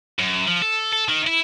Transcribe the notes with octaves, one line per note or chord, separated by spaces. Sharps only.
F#2
F3
A4
A4
D#3
E4